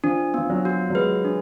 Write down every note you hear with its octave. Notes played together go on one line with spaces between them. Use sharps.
F3 D4
F3 B3
F#3
F#4
F#3
G#3 B4
D4